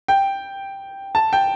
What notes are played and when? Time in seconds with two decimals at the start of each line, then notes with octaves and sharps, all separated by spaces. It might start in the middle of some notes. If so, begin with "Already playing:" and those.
0.08 G5
1.15 A5
1.33 G5